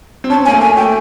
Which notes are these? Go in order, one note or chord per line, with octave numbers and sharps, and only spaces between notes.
C4
C#4 A5
A#3 G#5
A3
G#5
A3 G5